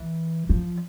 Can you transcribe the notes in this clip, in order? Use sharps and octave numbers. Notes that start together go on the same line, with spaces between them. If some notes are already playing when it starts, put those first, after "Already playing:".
Already playing: E3
F3